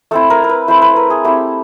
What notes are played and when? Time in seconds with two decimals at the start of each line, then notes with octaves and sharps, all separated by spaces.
0.11 A3 C4 E4 A4
0.30 A#4
0.44 A#4
0.49 B4
0.68 A3 C4 E4 C5
0.82 B4
0.96 A#4
1.10 G#4
1.24 A3 C4 E4 G4